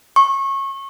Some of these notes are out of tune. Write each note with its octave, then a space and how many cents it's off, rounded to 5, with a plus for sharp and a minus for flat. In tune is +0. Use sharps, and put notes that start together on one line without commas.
C#6 -25